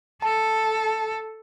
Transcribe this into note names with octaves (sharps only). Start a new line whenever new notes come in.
A4 A5